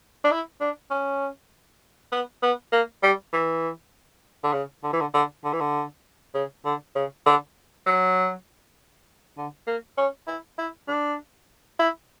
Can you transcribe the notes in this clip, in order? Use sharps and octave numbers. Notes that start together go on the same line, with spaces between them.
D4
E4
D4
C#4
B3
B3
A#3
G3
E3
D3
C#3
D3
E3
D3
D3
D3
E3
D3
C#3
D3
C#3
D3
F#3
D3
A#3
C#4
E4
E4
D4
E4